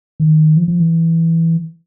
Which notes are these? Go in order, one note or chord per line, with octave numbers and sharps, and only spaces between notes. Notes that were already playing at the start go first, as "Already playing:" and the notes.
D#3
F3
F3
E3